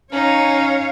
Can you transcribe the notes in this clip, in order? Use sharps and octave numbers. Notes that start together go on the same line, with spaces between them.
C#4 D#4 C#5 F5